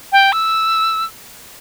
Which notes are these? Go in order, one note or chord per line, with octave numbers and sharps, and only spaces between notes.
G5
E6